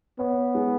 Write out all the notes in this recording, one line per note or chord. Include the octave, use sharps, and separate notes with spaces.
B3 C#5
G#3